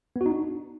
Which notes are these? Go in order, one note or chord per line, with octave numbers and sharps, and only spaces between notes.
B3
F#4
D#4
D4